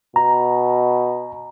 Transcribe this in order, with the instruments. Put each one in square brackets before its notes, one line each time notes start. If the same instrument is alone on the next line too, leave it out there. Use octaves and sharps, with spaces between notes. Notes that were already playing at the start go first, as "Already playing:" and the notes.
[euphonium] B2 [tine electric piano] A#5